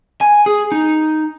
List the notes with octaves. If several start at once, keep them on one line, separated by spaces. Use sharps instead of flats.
G#5
G#4
D#4